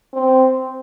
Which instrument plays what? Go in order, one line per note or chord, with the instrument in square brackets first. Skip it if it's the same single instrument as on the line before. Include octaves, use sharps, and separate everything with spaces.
[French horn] C4